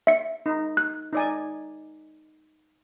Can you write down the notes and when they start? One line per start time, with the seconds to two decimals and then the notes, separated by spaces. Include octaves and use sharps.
0.07 E5 C#7
0.46 D#4
0.77 F#6
1.13 D#4 D5 G#5